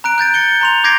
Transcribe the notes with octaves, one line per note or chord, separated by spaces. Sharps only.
A#5 F#6 D7
F#6 G6 A6 D7
C#7 D7 G7
A#5 C6 F7
D6 G6 G#6 A#6 C7 D7